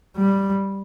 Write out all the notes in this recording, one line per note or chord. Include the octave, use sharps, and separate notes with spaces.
G3